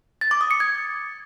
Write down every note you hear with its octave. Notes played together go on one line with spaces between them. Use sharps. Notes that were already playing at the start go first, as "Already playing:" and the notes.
A6
D6
D#6
C#7
G#6